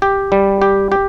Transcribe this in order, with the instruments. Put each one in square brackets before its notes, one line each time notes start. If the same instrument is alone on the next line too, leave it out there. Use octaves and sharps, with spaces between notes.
[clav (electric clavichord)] G4
G3
G4
G4